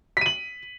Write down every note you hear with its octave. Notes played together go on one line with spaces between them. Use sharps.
B6 D#7 F#7